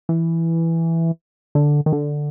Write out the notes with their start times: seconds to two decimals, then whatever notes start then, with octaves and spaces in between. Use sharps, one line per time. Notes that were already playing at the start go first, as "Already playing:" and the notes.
0.09 E3
1.55 D3
1.86 D#3
1.93 D3